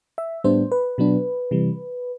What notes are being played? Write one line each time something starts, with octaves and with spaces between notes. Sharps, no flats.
E5
A2 G3 B3 D4 C5
B4
B2 F#3 B3 D4
C3 E3 G3